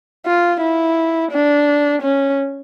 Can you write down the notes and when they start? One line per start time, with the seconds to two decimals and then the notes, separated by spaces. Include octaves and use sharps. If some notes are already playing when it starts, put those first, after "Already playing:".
0.26 F4
0.61 E4
1.32 D4
2.02 C#4